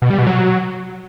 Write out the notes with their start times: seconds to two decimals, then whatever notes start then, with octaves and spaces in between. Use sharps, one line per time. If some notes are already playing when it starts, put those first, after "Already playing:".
0.02 B2
0.10 G3
0.18 B2
0.27 F#3